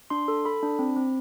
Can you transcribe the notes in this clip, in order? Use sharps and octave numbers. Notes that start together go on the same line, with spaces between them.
D4 C6
A4
A4 B5
D4
C4
C4